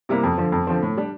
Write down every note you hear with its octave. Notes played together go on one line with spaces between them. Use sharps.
C3 G3 A#3 E4
F2
D3 F3
F2
D3 F3 C4
A2
G3 D4